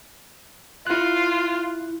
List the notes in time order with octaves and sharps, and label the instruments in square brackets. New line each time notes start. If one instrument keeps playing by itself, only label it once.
[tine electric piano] E4 F#6 [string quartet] F4